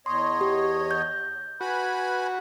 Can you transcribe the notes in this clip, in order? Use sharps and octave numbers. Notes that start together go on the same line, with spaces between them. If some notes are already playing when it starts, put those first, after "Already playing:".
E2 C#5 D#5 C6
G4
G6
F#4 B4 G#5 B5